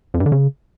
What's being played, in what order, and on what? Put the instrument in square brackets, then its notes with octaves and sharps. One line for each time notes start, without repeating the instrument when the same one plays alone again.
[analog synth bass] F2
G2
D3
C#3